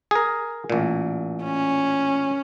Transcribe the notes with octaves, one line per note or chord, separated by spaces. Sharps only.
G#4 A#4
A1 A#2
C#4